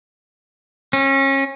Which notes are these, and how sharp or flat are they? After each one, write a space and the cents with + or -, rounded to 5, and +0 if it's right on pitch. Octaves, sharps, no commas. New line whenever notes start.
C#4 -30